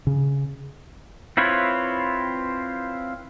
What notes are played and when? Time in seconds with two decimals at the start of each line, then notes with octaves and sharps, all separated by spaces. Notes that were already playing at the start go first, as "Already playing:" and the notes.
0.07 C#3
1.37 C4 E4 F4 B4 C#5